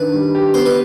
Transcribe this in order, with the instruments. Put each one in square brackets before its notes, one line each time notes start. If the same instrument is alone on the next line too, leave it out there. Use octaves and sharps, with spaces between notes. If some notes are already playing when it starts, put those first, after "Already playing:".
Already playing: [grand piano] D#3 D4 [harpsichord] B4 B5
[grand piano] G3
G4
[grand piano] B3 [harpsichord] C5
[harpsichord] B4